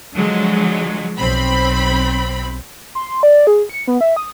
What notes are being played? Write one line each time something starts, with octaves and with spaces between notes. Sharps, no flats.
D3 F3 F#3 G#3
B1 C4 B5
C6
D5
G#4
C#7
B3
E5
D#6